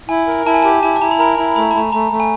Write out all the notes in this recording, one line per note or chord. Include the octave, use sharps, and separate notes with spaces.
E4 G#5
A#4
E4 A5
G#5
G4 A5
E4 A5
A5
E4 A#5
B5
A#4 A#5
E4 B5
A3 B5
A#5
A5
A3 A#5
A3 A#5
A3
G#5